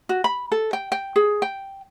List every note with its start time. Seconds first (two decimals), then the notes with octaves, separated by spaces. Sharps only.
0.09 F#4
0.24 B5
0.52 A4
0.73 G5
0.92 G5
1.16 G#4
1.42 G5